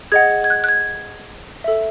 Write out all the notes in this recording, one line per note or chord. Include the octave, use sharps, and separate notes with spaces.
G#4 D#5 F#5 G#6
G#6
F#6
F#6
G#6
A4 E5